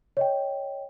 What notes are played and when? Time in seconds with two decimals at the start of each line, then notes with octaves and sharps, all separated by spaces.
0.17 C#5 D#5 G5